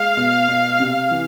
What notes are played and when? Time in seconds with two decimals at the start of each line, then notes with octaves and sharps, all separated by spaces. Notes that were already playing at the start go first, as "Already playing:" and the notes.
Already playing: G#3 F5
0.17 B2
0.48 B2
0.80 C3
1.11 E3